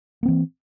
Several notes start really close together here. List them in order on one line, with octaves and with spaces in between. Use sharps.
A#3 C4 E3